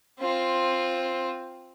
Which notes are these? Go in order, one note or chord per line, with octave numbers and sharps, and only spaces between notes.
C4 F4